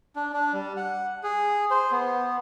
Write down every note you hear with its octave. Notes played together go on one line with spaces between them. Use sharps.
D4
D4
G3
F#5
G#4
C5
B3